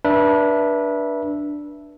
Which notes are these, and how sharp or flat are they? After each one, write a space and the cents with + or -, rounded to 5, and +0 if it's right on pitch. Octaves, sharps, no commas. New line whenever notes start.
D4 +0 B4 -30 E5 +0